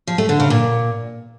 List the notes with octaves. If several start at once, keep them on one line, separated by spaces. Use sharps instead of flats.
F3
A3
D3
C#3
A#2